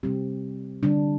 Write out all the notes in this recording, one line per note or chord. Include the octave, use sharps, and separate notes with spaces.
C3 G3 C4 G4
D3 G3 D4